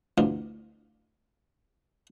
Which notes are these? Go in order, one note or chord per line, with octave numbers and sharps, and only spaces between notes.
D2 E3 B3 D4 F4 A#4